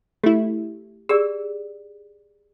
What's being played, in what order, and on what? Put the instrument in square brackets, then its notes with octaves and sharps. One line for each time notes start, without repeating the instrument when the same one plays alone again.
[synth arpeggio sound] A3 E4 [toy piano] G4
[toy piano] G4 G#4 D5 [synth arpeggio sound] E6